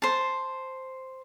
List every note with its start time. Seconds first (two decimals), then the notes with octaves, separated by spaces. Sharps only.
0.02 C5 A5